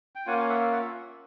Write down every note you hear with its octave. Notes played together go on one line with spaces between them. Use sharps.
G5
A#3 C#4 F4 F#5 G#5
E5 F#5
E5 F#5